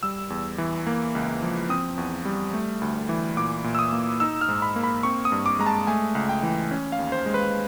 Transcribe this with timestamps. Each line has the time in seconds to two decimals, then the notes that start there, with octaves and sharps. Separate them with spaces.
0.03 G3 E6
0.30 E2
0.58 E3
0.87 A#3
1.15 C#2
1.42 F3
1.69 C4 D#6
1.98 E2
2.25 G3
2.53 A3
2.81 D2
3.09 E3
3.37 A#2 D6
3.64 A#2
3.75 E6
3.79 D#6
3.92 A#3
4.20 D#4 E6
4.41 F6
4.48 G#2
4.62 B5
4.76 A#3
4.84 B5
5.03 C4 C#6
5.25 D#6
5.32 G2
5.46 D6
5.59 G#3 A#5
5.66 A5
5.87 A3 G#5
6.15 C#2
6.29 G5
6.43 E3
6.71 C#4
6.92 F5
6.99 D#2
7.12 C5
7.26 G#3
7.34 B4